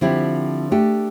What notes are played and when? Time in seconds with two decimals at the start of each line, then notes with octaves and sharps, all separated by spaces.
0.01 D3 F3 C4 E4 G4
0.71 A3 D4 G4